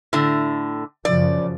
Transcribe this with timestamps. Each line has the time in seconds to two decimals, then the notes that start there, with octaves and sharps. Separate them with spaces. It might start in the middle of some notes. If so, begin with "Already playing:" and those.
0.13 A2 D3
1.05 F#2 C#3 F3 D5